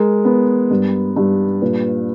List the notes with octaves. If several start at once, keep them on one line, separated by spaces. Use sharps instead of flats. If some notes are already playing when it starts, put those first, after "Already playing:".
Already playing: G#3 A#4
B3
G2
G2
A#2 B4